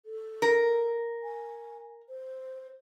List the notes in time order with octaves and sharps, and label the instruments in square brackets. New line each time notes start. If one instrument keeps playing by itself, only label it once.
[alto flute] A4
[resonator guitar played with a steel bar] A#4
[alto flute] G#5
C5